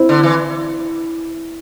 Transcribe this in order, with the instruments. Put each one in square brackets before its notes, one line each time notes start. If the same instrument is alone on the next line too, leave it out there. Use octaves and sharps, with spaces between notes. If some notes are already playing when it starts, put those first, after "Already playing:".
Already playing: [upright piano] C4 E4
[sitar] D3
E3